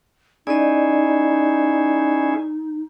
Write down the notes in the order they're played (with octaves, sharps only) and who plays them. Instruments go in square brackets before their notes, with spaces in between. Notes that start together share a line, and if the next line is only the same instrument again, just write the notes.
[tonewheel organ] C#4 E4 G#4 [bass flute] D#4 [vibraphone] D5 D#5